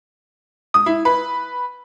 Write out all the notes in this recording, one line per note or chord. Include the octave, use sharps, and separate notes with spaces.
D#6
E4
B4